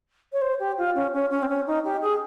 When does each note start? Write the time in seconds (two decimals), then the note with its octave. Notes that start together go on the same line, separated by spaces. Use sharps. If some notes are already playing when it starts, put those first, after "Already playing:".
0.32 C#5
0.41 C5
0.59 G4
0.77 F4
0.95 C#4
1.13 C#4
1.30 C#4
1.42 C4
1.48 C#4
1.66 D#4
1.84 G4
2.01 G#4